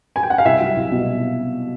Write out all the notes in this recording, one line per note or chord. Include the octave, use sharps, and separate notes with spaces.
G#5
G5
F#5
F5
C2 E5
F#3
C2
B2